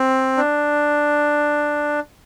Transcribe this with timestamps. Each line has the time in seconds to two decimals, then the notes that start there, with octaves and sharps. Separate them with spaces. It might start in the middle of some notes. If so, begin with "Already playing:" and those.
Already playing: C4
0.37 D4